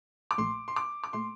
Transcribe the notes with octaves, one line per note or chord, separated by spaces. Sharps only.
D6
A#1 A#2 A3 C6
C6
D6
D6
A#2 A3 C6